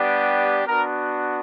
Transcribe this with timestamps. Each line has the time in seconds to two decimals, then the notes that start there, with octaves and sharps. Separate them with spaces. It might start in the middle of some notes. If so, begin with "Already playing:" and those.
Already playing: G3 B3 D4 G4
0.66 B3 D4 F#4 A#4